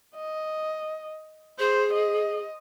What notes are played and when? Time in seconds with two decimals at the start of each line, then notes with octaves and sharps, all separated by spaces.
0.16 D#5
1.59 G#4 C5
1.93 D#5